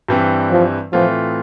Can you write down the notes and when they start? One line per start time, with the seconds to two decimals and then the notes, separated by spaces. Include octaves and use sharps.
0.09 G2 E3 G3 C4
0.51 F3
0.93 A2 E3 F3 A3 C4 F4